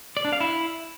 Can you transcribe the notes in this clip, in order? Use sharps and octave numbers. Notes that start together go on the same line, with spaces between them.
D5
D4
F5
E4